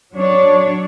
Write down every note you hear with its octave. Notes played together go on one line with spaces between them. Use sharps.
F#3 D4 C#5